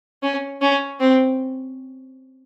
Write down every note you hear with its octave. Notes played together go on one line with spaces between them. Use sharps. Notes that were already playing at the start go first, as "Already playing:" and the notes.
C#4
C#4
C4